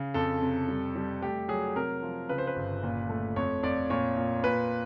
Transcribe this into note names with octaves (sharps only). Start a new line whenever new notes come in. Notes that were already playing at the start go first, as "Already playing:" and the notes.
Already playing: C#3
F2 A4
C3
G3
G3
A3 G4
F#3 G#4
C3 A#4
F3
C#3 B4
C5
B4
G1
A#2
A3
F2 C#5
F2 D5
A#2 C#5
A#2
A#2 B4